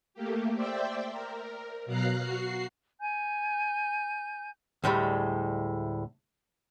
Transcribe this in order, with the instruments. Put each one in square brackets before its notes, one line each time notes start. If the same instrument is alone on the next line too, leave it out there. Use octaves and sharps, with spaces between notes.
[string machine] A3 A#3 G4
C5 D5 E5 G5
A#4
B2 F#3 F5 A#5 F#6 C7
F#4 C7
[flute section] G#5 G6
[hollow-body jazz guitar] D2 A2 G3 G#3